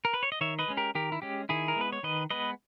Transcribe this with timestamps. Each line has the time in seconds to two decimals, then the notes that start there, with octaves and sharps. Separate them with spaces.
0.05 A#4
0.14 B4
0.23 C#5
0.32 D#5
0.41 D#3 C#5 E5
0.59 B4 D#5
0.68 G#3 C#4
0.77 G4 A#4
0.95 D#3 G4 A#4
1.12 E4
1.22 G#3 C#4 G4
1.49 D#3 E4 G#4
1.68 A#4
1.76 G#3 B3 B4
1.92 C#5
2.03 D#3 B4 D#5
2.30 G#3 B3 B4 D#5